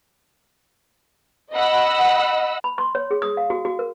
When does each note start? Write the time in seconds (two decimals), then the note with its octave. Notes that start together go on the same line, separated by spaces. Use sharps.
1.54 D#5 F#5 B5 E6
2.64 B5
2.78 C6
2.95 C#5
3.11 G#4
3.22 D#6
3.37 F5
3.50 F#4
3.65 F#4
3.79 A#4